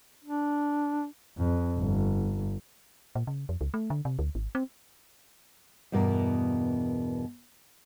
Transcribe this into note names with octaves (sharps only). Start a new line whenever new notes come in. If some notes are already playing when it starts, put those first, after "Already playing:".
D4
F2
G1
A#2
C#3
F2
C#2
A3
D3
C3
D2
G#1
C4
E2 G2 B2 A#3 A#4